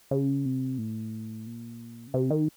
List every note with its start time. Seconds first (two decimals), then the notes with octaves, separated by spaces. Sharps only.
0.11 C#3
0.45 C3
0.78 A2
1.47 A#2
2.07 C#3
2.14 C3
2.31 D#3